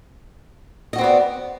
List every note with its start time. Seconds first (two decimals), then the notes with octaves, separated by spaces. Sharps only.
0.93 D#5
0.96 F#4
0.98 C4
1.01 B3
1.04 D5